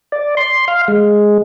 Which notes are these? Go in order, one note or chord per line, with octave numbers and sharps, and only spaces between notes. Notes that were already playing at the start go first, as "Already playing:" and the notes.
D5
C6
F5
G#3